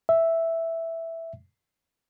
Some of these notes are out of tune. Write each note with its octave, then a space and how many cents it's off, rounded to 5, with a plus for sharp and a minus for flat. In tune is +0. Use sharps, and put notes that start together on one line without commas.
E5 +0